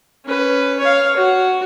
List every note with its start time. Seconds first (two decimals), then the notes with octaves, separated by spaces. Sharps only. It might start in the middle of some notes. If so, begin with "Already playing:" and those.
0.25 C#4 B4
0.79 C#5 F5
1.16 F#4